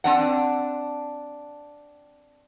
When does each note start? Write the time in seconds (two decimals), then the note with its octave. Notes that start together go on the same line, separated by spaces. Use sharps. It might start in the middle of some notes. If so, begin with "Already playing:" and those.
0.04 C4 D4 F#5